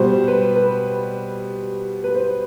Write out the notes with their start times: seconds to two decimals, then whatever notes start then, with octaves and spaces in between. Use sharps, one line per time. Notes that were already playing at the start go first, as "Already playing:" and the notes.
Already playing: B2 G3 C5
0.28 B4
0.56 B4
2.04 B4
2.15 C5